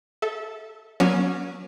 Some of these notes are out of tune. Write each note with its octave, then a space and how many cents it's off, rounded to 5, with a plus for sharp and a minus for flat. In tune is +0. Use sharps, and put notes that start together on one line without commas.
A4 -5 E5 -25
F#3 -20 A#3 +45 C#4 +0